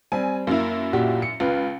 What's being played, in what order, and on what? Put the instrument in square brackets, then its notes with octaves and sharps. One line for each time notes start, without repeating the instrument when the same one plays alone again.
[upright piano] G3 C4 [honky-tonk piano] G#5
[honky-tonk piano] F#2 E4 [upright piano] A#3
[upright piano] A#2 F#4 G4
C#7
[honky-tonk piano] C#2 [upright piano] F4 B4